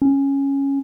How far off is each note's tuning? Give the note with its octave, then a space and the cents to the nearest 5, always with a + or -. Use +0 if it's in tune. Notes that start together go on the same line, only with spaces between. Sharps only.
C#4 -5